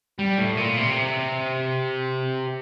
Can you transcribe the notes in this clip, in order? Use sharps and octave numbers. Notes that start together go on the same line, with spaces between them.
G3
A2
A#2
C3